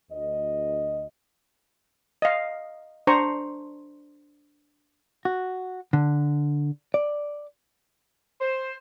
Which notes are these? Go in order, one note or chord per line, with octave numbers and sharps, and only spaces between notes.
D2 D#5
D#5 F5
D4 C5 A#5 C#6
F#4
D3
D5
C5